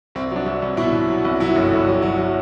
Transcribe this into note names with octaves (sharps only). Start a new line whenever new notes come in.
C2 C4
F#3 D4
C2
C2
B2 E4
B2
F#3
C2
F#3 E4
G1
G1
F#3
F#3
F#3